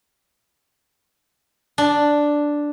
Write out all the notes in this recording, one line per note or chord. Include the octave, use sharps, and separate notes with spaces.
D4